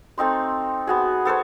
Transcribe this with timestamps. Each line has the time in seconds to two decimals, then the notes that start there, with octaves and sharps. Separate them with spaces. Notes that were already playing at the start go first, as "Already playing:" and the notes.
0.18 A3 C4 D#4 C6
0.87 B3 F#4 G#4
1.25 B3 A4 C5 C#5